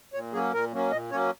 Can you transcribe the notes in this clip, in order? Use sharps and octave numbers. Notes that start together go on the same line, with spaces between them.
A#2 C#5
F#3 A#3 C#4 G#4
A#2 A#4
F#3 A#3 C#4
A#2 D#5
F#3 A#3 C#4 C#5